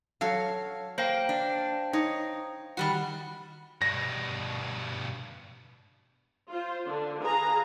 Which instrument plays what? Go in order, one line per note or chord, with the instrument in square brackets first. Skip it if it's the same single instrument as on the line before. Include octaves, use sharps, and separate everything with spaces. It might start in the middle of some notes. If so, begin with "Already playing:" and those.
[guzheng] F#3 A4 C#5 [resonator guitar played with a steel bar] F5
[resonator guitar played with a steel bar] A#3 [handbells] C5 F5 G5
[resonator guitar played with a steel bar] D4
[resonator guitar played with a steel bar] D#4 [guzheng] C#5
[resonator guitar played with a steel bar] D#3 G3 F#4 [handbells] F#5 B5
[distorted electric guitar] G2 B2 [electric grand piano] A#6
[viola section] F4 C5
D3 D4
G#4 B4 F5 A#5